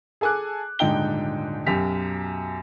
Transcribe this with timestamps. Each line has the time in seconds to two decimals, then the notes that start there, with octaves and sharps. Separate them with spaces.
0.21 G#4 A4 G#5 D6 F#6
0.79 D#1 G#2 D3 D#4 G5 G7
1.66 B1 F#2 G4 B6 F7